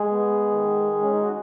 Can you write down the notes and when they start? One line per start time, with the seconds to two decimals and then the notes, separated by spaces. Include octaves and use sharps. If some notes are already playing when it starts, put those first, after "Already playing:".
Already playing: G#3 G#4
0.11 B3
0.51 D#3
0.92 G#3
1.02 C#4
1.13 D#4
1.22 F#4